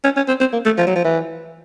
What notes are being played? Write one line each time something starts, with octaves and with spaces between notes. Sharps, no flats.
C#4
C#4
C4
C4
A#3
A3
F3
F#3
F3
E3